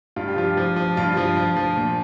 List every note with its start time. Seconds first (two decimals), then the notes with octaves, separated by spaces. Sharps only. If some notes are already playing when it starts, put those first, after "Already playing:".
0.16 G2 F4
0.28 G4
0.36 F3 F4
0.57 F3
0.76 F3
0.97 G2 F4
1.17 F3
1.37 F3
1.56 F3
1.76 A#2